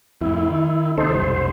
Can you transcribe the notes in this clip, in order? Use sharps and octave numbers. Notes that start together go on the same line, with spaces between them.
F2 A2 E4
D#3
D#2 C3 D#4 A4 C5
F1 B1 G3 C5